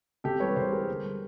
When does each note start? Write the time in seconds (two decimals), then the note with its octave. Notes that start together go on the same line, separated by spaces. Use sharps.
0.24 C3 G4 A4
0.40 E3 G3 B4 C#5
0.56 C3 A#4 C5
0.72 E3 G3 G#4 A#4
0.88 D3
1.04 G3